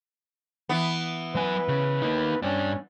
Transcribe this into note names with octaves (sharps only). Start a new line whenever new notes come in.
E3 B3
F#3 B4 G#5
C#3
A#3 D#4
G2 C#4 D4